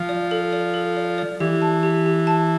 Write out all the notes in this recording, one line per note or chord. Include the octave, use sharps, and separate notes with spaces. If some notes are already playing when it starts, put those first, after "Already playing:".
Already playing: F3
D5
A4
D5
A4
D5
D5
E3 G4
A5
G4
G4
A5